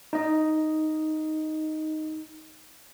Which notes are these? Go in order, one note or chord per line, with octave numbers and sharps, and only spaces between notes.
D#4 D#5